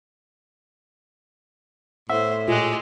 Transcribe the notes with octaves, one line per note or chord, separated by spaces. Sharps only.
A2 B3 C5 E5
A#2 G#3 G4 F#6